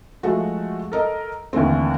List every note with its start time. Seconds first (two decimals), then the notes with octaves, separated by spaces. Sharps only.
0.23 F3 G#3 A3 F#4
0.92 A4 A#4 D#5
1.53 D#2 D3 E3 A3 C4